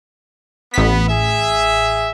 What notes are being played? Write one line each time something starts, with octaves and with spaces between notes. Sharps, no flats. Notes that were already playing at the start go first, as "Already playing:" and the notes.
A1 B3 B6
G#4 E5